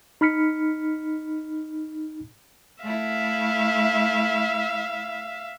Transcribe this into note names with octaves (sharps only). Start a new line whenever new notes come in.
D#4 B5 F6 B6 C#7
A3 E4 E5 F5